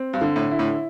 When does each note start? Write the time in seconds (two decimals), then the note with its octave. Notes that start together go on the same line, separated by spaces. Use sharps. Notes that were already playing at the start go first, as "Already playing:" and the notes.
Already playing: C4
0.13 G2
0.21 D3
0.36 A2
0.51 E4
0.59 A2